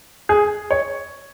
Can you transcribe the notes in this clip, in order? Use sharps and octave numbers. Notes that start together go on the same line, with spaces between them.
G#4
C#5